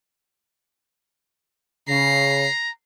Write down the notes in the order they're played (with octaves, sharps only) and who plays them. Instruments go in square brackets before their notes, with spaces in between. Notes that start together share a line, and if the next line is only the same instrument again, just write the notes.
[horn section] C#3 [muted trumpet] A#5 [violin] C7